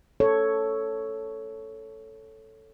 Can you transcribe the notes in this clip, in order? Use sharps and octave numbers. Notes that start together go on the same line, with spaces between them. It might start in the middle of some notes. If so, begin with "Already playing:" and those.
A4 C#5